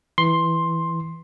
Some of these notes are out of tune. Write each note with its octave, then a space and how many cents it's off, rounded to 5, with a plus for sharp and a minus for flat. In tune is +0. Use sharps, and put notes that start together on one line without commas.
E3 +0 C6 +10